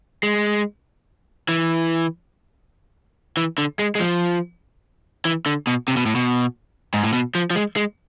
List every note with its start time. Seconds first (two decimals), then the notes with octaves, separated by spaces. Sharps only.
0.23 G#3
1.49 E3
3.37 E3
3.58 D3
3.79 G#3
3.95 G#3
4.00 F3
5.25 E3
5.46 D3
5.67 B2
5.88 C3
5.97 B2
6.06 A2
6.15 B2
6.94 G#2
7.03 A2
7.13 B2
7.35 F3
7.50 F3
7.56 G#3
7.76 G#3